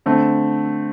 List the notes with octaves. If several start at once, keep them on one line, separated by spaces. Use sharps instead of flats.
D3 A3 C4